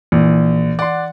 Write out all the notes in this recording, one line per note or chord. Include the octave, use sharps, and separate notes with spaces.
A#1 E3
D5 F#5 C6